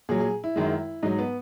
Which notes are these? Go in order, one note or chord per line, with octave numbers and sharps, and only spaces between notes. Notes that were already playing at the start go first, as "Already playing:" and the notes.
A#2 F#3 G#4
G#4
E4
F#2 D#3 G#3
G#2 F#3 D#4
B3